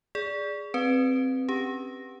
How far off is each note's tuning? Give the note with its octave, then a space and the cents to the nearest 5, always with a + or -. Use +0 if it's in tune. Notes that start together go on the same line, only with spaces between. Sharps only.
G#4 -5 D5 -10
C4 +0 B4 +0
C#4 +0 G4 +10